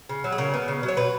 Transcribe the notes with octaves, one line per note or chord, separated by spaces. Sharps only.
C#3
F#3
G#4
C#3 A#4
B3
C#3
F#3
C#5
B2 B4